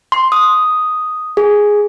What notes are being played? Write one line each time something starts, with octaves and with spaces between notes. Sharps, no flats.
C6
D#6
G#4